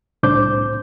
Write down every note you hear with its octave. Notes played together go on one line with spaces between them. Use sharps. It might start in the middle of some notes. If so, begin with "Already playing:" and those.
C2 A2 D4 C5 D6 G6